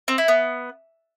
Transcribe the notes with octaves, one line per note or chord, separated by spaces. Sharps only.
C4
E4
B3